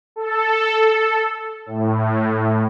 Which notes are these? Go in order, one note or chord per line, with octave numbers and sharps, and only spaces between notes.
A4
A2